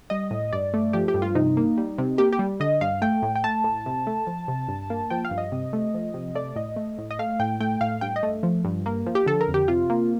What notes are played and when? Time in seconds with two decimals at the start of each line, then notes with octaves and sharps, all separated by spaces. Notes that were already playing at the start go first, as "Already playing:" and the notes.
0.10 G3 D#5
0.31 A2
0.52 G2 D5
0.74 A3
0.93 F3 G4
1.08 G4
1.14 G2
1.22 F4
1.35 C3 D#4
1.57 A#3
1.77 G3
1.98 C3
2.18 A#3 G4
2.33 G4
2.39 G3
2.60 D3 D#5
2.81 G2 F5
3.02 A3 G5
3.23 A2
3.36 G5
3.44 A3 A5
3.64 A2
3.86 C3
4.07 A3
4.27 F3
4.48 C3
4.68 G2
4.90 A#3
5.10 F3 G5
5.25 F5
5.31 G2
5.38 D#5
5.52 C3
5.73 A3
5.94 F3
6.14 C3
6.35 A3 D5
6.56 A2 D#5
6.76 A3
6.98 A2
7.11 D#5
7.19 A3 F5
7.40 A2 G5
7.60 A3 G5
7.81 A2 F5
8.01 G2 G5
8.16 D#5
8.23 A3
8.43 F3
8.65 G2
8.86 A#3
9.06 F3
9.15 G4
9.26 D3 A4
9.41 A#4
9.48 F2
9.54 G4
9.68 C3 F4
9.90 A#3